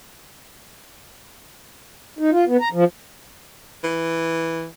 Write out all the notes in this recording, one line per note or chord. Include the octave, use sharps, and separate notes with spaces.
D#4
F4
B3
A#5
F3
E3